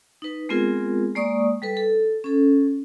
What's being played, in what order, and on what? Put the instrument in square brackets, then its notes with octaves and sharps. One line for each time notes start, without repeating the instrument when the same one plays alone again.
[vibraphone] D#4 B4
G#3 B3 C4 F4 G#4 A#4
G#3 A#3 D5 C#6 D#6
G3 A4 B4
A4
C#4 A4